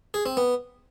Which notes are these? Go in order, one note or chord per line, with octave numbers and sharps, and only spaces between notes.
G#4
C4
B3